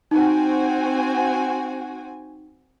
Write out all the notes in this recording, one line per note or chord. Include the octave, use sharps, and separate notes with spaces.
C4 D#4 F#4 G#5